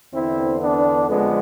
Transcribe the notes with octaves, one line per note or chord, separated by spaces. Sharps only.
E2 D3 C4 E4
B3 D4
F2 D3 G#3 B3